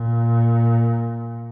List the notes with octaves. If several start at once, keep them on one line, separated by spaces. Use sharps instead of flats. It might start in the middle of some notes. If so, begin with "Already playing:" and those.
Already playing: A#2